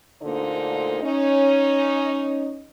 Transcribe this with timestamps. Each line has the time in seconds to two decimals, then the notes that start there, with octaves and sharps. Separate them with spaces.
0.22 D2 A#2 D3 A#3 D#4 C5
1.02 C#4 D#4